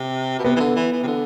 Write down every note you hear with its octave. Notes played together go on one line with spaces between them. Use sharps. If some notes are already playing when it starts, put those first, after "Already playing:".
Already playing: C3
B2
C3 B3
E3
D3
E3
E3
C3
D3